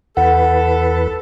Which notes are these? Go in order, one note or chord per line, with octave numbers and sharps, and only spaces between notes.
E2 A4 B4 F#5